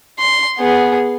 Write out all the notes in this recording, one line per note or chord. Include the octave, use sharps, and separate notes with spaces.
C6
B3 G#4